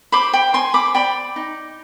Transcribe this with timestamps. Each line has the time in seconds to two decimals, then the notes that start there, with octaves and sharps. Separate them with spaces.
0.12 C5 B5 D6
0.33 G5 B5
0.54 C5 G#5 C6
0.74 B5 D6
0.94 D5 G5 B5
1.36 D#4